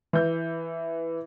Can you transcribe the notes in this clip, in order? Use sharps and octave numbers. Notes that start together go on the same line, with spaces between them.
E3 G6